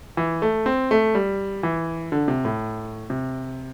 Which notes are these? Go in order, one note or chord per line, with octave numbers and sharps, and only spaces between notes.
E3
A3
C4
A3
G3
E3
D3
C3
A2
C3